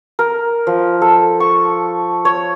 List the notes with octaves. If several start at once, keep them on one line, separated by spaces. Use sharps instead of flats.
A#4
F3
A4
C#6
C#5